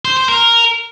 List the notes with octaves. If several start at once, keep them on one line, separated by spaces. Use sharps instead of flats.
C5
C5
A#4